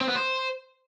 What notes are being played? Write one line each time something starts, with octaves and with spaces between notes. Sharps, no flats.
C4
B3
C5